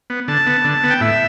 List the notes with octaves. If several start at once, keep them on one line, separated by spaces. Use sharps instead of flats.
B3
D3 A5
B3
D3
B3
G5
A2 E5